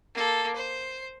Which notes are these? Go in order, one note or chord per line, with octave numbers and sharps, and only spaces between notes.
A#3 A4
C5